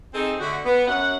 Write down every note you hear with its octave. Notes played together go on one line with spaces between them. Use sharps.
C4 D#4 G#4 A4 C5
D3 A3 F#4
B3
F#2 F#5